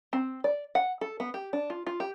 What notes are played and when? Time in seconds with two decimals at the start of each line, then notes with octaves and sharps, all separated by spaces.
0.13 C4
0.44 D5
0.75 F#5
1.01 A4
1.20 B3
1.34 G4
1.53 D4
1.70 F4
1.86 F4
2.00 G4